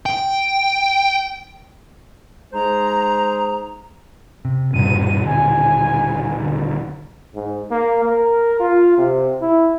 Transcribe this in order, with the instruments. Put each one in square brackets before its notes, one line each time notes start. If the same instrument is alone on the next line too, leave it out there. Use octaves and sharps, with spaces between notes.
[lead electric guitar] G5
[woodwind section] G#3 D#4 G#4 C5 A#5
[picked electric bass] C3
[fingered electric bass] D#1 B2 C4 [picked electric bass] G2 [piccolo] D#7
[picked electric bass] D3 [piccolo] G#5
[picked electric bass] D3
[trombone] G#2
A#3
A#4
F4
C3
E4